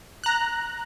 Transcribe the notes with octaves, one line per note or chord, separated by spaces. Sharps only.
A#5 F#6